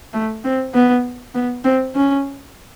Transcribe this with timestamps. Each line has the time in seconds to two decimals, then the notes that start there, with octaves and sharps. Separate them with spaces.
0.13 A3
0.44 C4
0.74 B3
1.35 B3
1.64 C4
1.95 C#4